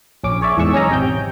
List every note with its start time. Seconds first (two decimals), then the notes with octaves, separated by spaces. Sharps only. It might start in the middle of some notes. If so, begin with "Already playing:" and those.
0.24 A#1 C#4 D6
0.41 G#4 C#5 D5 E5
0.57 E2 G#2 G#4 C#6 E6
0.72 B1 C#4 D#5 G#5 A#5
0.90 G#1 C3 G5 G6